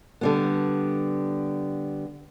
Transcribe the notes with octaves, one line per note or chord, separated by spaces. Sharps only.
D3 G3 B3